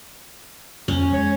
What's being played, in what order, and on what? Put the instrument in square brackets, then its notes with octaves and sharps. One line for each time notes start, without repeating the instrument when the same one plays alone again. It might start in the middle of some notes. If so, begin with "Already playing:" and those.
[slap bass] F2 [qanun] C#4
[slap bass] G#3 [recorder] C#5